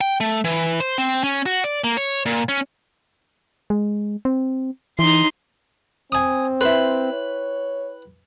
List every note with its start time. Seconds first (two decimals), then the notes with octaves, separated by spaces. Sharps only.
0.01 G5
0.21 A3
0.44 E3
0.80 C5
0.98 C4
1.24 C#4
1.46 F#4
1.64 D5
1.84 A#3
1.97 C#5
2.26 A#2
2.49 C#4
3.70 G#3
4.25 C4
4.99 E3 D#4 C6
6.12 C4 G#5 D#6
6.61 E4 B4 G5 C6
7.13 C#5